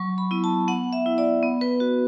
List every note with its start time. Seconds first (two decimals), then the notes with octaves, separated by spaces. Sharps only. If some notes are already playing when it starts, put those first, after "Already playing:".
Already playing: F#3 C#6
0.18 B5
0.31 B3 E4
0.44 A5
0.68 B3 F#5
0.93 E5
1.06 E4
1.18 D5
1.43 B3
1.61 B4
1.80 F#4